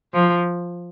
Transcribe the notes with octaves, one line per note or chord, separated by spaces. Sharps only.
F3